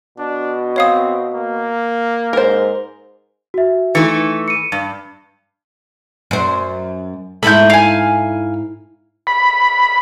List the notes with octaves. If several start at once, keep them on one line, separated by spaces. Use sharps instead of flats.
B2 D4
C4 C#5 F5 D#6
A#3
G#2 A#4 C5
F#4 E5
E3 A3 D#4 C#7
C#7 D#7
G2
F#2 C5
G#2 E4 A4 B5 G6
F5 G#5
B5